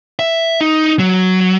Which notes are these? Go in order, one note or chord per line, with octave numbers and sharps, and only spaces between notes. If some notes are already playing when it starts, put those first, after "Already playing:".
E5
D#4
F#3